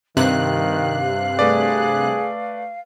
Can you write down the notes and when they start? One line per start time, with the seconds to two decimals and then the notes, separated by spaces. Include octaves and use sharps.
0.17 G2 C3 D#3 F5 F#6
1.39 A3 G#4 B4 D5